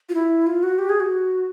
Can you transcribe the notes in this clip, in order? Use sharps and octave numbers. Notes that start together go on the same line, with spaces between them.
F4
E4
F4
F#4
G4
G#4
F#4